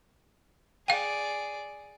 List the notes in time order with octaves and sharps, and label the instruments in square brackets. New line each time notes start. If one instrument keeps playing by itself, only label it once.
[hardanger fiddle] G#4 D5 [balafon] F5 G5